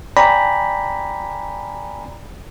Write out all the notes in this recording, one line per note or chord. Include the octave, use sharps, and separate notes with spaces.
D5 G5 G#5 A#5 B5